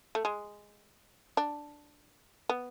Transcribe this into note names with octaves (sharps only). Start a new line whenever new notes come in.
A3
G#3
D4
B3